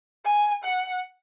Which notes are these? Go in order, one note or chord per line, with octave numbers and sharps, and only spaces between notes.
G#5
F#5